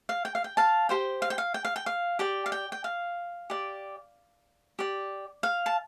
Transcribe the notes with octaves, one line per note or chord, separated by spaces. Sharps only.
F5
G5
F5
G5
F5 A5
G4 C5 G5
F5
G5
F5
G5
F5
G5
F5
G4 D5 G5
F5
G5
G5
F5
G4 D5
G4 D5
F5
A5